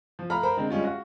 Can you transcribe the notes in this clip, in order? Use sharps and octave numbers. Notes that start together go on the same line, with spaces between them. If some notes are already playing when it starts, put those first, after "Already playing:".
F3
A3 F5 A#5 B5 F6
A#4 C5 A#5 B5
D3 G#3 C4
G3 G#3 C#4 F4
F#4 F5